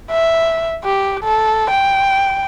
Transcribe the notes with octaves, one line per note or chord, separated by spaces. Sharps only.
E5
G4
A4
G5